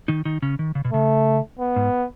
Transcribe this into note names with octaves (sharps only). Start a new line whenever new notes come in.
D#3 D#4
D#3 D#4
C#3 C#4
D#3
C#3
B2
C#3 A3
B3
G#2